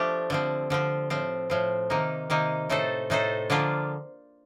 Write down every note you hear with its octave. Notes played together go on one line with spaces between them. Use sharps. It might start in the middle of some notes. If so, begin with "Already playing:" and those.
Already playing: F3 A3 D4 G4
D3 F3 C4
D3 F3 C4
A2 F3 C4
A2 F3 C4
C3 D#3 A#3 D#4
C3 D#3 A#3 D#4
A2 A3 D#4 A4 C5
A2 A3 D#4 A4 C5
D3 F3 A#3 D4 F4